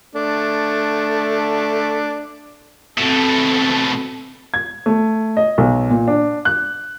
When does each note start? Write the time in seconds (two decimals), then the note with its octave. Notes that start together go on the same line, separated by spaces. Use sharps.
0.15 A3 D4
2.98 B2 A3 C4 A4
4.54 G#6
4.86 A3
5.37 D#5
5.58 B1
5.90 A#2
6.08 D4
6.45 F#6